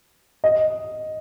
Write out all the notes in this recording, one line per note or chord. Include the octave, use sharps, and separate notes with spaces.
D#5